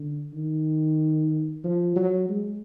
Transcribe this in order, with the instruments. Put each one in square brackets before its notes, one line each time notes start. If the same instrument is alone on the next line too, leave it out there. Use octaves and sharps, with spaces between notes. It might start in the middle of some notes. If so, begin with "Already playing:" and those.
Already playing: [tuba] D3
D#3
F3
F#3
G#3